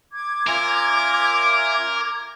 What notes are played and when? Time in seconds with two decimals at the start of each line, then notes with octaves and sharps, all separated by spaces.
0.12 D6 G#6
0.47 C#4 F4 A#4 E5